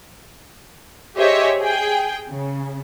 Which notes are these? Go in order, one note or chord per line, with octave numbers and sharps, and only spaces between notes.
G4 G#4 C5 C#5 D#5 E5
G#4 G5
C#3